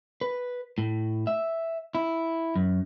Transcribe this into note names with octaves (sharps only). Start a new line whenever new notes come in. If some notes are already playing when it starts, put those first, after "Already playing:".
B4
A2
E5
E4
F#2